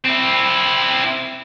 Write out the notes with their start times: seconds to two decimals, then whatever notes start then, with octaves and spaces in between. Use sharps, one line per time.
0.04 C4 E4